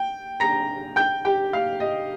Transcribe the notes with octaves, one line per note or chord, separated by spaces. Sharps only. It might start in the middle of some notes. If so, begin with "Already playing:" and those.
Already playing: G5
A#5 A#6
G5 G6
G4 G5
F5
D#5